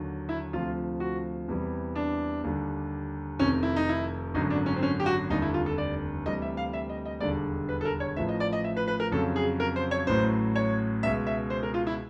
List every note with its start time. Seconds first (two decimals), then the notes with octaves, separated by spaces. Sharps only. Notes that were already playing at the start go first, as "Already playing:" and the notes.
Already playing: D#2 D3 F#3
0.29 E4
0.53 D2 C3 F3 F4
1.00 F#4
1.48 E2 C3 E3 G3
1.95 D4
2.44 D#2 D3 G3
3.39 F1 F2 C3 D#3 C#4
3.63 E4
3.76 D#4
3.89 E4
4.34 G#1 F#2 D3 F#3 D#4
4.50 D4
4.66 C#4
4.76 C4
4.83 C#4
5.00 G4
5.06 F#4
5.30 F1 D#2 D3 G3 D#4
5.42 E4
5.54 F4
5.66 A4
5.78 D5
6.25 D2 C3 E3 G3 D#5
6.42 E5
6.57 F5
6.73 E5
6.89 D#5
7.05 D#5
7.20 E1 D#2 D3 G3 D5
7.69 B4
7.81 A4
7.85 A#4
8.00 C#5
8.16 A1 A2 F3 E5
8.29 D#5
8.40 D5
8.53 D#5
8.64 E5
8.77 B4
8.88 B4
9.00 A#4
9.11 F2 C#3 F#3 A4
9.36 G#4
9.60 A#4
9.76 C5
9.91 C#5
10.07 A1 A2 F#3 C5
10.56 C#5
11.03 C#2 B2 G#3 E5
11.27 E5
11.50 C5
11.63 A#4
11.74 F4
11.87 E4